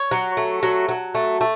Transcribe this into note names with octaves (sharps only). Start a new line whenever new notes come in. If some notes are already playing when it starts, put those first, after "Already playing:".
Already playing: C#5
F#3
A3
F#3
F#3
A3
A3